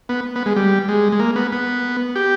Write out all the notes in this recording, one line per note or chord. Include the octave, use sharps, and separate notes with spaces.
B3
B3
G#3
G3
G#3
G#3
A#3
B3
B3
G4